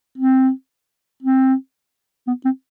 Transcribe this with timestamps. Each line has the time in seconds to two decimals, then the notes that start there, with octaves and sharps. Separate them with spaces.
0.18 C4
1.23 C4
2.28 B3
2.45 C4